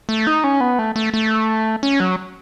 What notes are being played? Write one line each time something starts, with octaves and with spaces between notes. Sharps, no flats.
A3
D#4
C#4
B3
A3
A3
A3
C#4
F#3